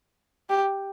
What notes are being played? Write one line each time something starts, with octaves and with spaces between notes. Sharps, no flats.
G4